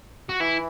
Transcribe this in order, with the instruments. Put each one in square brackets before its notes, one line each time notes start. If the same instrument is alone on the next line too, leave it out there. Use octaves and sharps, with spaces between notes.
[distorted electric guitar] F#4
[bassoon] E3 [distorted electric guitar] E4